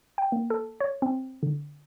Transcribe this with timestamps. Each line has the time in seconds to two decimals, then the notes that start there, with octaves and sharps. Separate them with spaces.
0.18 G5
0.32 A#3
0.50 A4
0.80 C#5
1.02 C4
1.43 D3